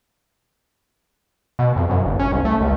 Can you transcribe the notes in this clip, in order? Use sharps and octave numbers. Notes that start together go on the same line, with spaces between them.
B2
F2
F#2
G1
C#4
C2
A3
C#2